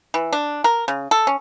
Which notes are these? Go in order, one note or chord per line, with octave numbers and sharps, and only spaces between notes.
E3
D4
A#4
C#3
A4
C#4